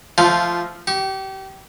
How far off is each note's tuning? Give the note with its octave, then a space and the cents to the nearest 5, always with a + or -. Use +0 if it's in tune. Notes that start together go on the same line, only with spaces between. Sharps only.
F3 -10 A3 +0 F4 +0
G4 -30 C#6 -5